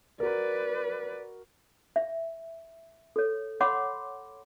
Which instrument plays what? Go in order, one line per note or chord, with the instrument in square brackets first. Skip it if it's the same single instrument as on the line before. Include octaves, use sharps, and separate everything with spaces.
[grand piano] F#4 A#4 [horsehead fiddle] B4 D5
[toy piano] E5
A4 C#5
C#5 F#5 B5 C6 D6